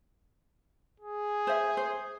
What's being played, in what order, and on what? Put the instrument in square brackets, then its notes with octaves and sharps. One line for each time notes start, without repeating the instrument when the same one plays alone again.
[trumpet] G#4
[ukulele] C5 E5
C5